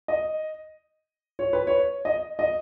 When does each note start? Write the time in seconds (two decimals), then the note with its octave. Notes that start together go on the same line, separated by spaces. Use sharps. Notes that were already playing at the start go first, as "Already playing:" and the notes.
0.08 D#5
1.39 C#5
1.53 B4
1.67 C#5
2.05 D#5
2.39 D#5